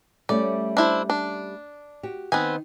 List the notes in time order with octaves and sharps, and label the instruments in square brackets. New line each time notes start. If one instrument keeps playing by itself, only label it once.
[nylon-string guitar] G3 A3 C#4 [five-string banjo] D5
[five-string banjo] D4 E4 C5
D4
[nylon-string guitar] F#4 G4
[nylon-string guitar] D#3 [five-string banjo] B3 C4 G#5